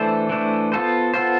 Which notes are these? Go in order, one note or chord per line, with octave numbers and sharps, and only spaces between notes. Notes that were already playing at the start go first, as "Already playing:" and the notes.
Already playing: E3 A3 D4 A4 C5
E3 A3 D4 A4 C5
B3 F4 A4 C5
B3 F4 A4 C5